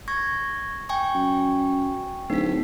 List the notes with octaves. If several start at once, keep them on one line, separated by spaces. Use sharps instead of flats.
C#6 G#6 A#6
G5 G#5 C#6
F#2
D1 D#4 B6